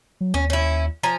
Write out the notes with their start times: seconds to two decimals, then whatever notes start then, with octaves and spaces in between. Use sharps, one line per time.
0.21 F#3
0.34 D#2 C#4
0.50 C#4 E4
1.03 F3 G#5 A#5